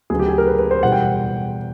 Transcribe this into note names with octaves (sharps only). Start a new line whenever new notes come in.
D2 C#3 F#3 B3 G#4
G4
G#4
A#4
B4
B4
C5
E2 B2 G3 F#5
G5